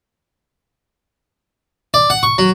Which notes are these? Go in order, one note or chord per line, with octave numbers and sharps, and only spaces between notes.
D5
F#5
C#6
F#3